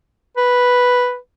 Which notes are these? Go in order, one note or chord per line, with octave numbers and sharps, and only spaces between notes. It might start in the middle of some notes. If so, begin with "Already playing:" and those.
B4